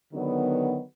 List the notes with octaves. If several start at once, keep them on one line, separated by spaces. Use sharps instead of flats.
D3 D#3 F#3 B3